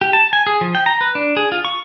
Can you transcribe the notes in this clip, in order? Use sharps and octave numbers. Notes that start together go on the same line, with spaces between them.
G4
A5
G#5
G#4
F3
G5
A#5
B4
D4
G#4
F4
C#6